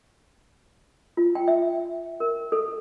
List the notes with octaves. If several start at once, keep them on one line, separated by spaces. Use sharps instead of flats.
F4
G5
E5
A#4
A4